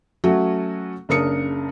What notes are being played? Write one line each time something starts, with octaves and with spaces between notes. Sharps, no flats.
F#3 A3 C#4 F#4
F#1 C#3 D4 A#4 D#6 C#7